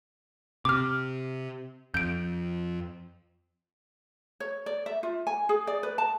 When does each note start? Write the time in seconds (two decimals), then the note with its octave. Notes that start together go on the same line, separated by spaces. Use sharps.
0.65 C3 D6 F6
1.94 F2 G6 D7
4.40 C#5
4.66 D5
4.86 E5
5.03 F4
5.27 G#5
5.49 G#4
5.67 D5
5.83 B4
5.98 A5